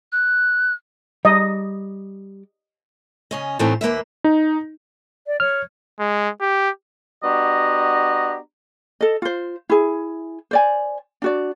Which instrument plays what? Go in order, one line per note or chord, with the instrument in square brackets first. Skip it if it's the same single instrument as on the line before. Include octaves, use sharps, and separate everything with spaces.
[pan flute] F#6
[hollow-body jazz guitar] G3 [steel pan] D#5
[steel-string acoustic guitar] C#3 C#4 D#5
A2 E3 A3 C4 D#4
D#2 A#3 B4 E5
[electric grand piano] D#4
[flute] D5
[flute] C#5 [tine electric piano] F6
[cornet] G#3
G4
[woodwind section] B3 D4 F#4 G4 D#5 A#5
[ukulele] A4 D#5
F4 C5
E4 G#4
C5 D5 G#5
D4 F#4 D5